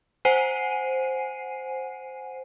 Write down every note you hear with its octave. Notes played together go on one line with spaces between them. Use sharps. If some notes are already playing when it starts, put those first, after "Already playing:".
C5 F#5 G#5 C7 D#7